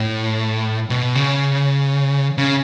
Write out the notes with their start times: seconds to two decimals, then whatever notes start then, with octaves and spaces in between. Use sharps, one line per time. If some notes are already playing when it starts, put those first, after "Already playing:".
Already playing: A2
0.90 B2
1.15 C#3
2.38 C#3